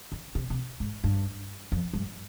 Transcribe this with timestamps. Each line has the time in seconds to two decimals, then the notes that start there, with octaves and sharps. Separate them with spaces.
0.12 D3
0.35 C3
0.50 C3
0.80 G#2
1.04 G2
1.72 F2
1.93 G2